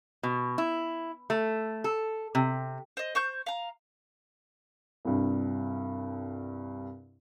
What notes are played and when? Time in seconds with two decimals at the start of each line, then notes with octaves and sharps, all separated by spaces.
0.23 B2
0.58 E4
1.30 A3
1.84 A4
2.35 C3
2.97 C5 D#5
3.15 C5 C#6 G6
3.46 F5 A#5
5.05 C2 G2